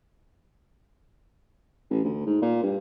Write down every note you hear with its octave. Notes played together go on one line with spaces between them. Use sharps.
A1
D2
G#2
A#2
G2